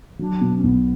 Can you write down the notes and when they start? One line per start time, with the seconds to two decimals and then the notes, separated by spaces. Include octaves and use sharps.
0.19 F#3 D4
0.41 B2
0.56 C#4
0.64 B1 B3